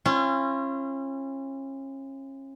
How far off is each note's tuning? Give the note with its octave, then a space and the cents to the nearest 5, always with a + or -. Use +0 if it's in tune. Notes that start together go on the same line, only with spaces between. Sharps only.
C#4 -35 F4 -40